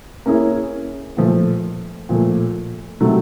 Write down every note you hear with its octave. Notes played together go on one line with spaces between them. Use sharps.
A#3 C#4 E4 G#4 C#5
A#2 F3 A3
A#2 F3 A3
C3 D#3 F#3 A3